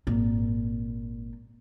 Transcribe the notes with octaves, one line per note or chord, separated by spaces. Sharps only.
G#1 A#2